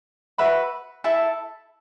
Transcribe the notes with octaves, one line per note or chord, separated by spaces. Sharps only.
F#4 B4 E5 B5
E4 A4 E5 A5